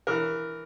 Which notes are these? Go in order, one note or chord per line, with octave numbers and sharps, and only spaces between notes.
E3 A#4